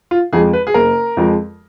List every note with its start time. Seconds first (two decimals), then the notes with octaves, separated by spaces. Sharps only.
0.11 F4
0.33 F2 F3 G#3 G#4
0.53 B4
0.67 G#4
0.74 F#1 A#4
1.17 F2 F3 G#3